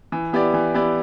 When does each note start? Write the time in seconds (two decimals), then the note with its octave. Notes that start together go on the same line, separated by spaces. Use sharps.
0.12 E3
0.33 B3 E4 G4 D5
0.54 E3
0.74 B3 E4 G4 D5